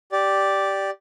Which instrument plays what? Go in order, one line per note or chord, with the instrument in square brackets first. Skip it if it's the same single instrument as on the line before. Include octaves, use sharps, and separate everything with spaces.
[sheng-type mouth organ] G4 D5